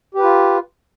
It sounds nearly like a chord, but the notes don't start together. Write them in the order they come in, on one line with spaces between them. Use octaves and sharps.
G4 B4 F4